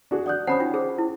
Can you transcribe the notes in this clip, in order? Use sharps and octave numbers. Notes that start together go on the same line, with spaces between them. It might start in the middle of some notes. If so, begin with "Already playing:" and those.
D4 F#4 G#4
D5 F#5 D#6 F#6 G6
C#4 C5 F#5 A5 B5 D#6
D#4 F4 G5
G#4 C5
E4